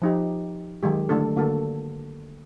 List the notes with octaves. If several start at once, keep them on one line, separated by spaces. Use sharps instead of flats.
F3 D#4 G4
D#3 F#3 G#3 G4
D3 A3 D4 A4
D3 A#3 F#4 A4